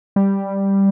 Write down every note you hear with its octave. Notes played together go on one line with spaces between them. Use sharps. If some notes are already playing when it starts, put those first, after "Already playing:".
G3